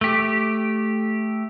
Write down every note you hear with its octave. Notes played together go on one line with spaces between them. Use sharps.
A3 G4